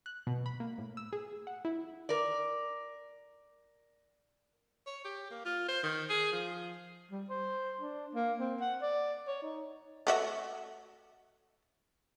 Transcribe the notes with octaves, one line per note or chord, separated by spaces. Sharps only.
F#6
B2
B5
A#3
A2
E6
G#4
F#5
E4
A#4 D5
C#5
G4
A#3
F4
C5
D#3
G#4
F3
G3
C5
D4
A#3
C4
F#5
D5
C#5
D#4
A3 F#4 E5